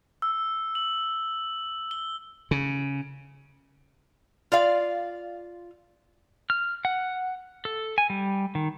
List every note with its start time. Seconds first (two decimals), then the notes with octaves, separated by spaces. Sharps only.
0.22 E6
0.75 F#7
1.91 G7
2.51 C#3
4.52 F4 D5 F5
6.50 F6
6.85 F#5
7.65 A4
7.98 G#5
8.10 G3
8.55 D#3